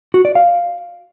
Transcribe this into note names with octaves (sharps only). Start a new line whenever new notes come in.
F#4
D5
F5